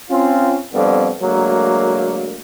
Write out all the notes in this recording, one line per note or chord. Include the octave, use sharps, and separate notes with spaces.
C4 C#4 F4
C2 F2 D3 G3 B3
D2 F#3 G#3 A#3